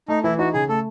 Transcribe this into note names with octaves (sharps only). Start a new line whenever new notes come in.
A3 D#4
E3 E4
D#4 F#4
C#3 G#4
A3 A4